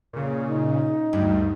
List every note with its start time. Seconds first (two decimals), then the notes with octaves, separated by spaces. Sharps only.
0.13 A#2 C#3
0.47 D#4
1.13 D2 G2 G3